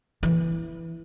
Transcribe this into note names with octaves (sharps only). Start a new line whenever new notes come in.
E3